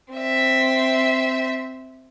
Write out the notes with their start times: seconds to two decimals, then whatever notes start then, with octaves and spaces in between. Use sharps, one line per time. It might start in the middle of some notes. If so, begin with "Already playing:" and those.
0.14 C4 E5